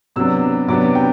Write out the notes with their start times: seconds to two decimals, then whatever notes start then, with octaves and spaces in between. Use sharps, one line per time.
0.16 C3 F#3 B3 D4 E6
0.68 C3 F#3 B3 D4 D6
0.95 G5